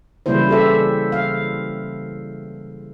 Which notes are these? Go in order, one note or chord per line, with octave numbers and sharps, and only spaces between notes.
C#3 E3 G3 A#3 E4 C5
G4 A4 E5
F5